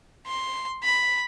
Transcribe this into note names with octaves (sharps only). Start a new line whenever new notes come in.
C6
B5